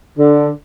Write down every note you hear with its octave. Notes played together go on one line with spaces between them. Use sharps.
D3